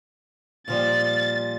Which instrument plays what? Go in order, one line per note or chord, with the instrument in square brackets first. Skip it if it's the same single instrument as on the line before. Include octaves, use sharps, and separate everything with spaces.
[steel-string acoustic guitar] A#2 F3 G3 [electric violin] A6